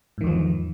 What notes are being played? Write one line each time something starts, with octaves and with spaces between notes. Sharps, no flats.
E2 G#2 D#3 F3